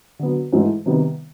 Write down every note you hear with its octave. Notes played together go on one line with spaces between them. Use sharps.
D3 F#3 B3
G#2 E3 A3
C3 D#3 G3 B3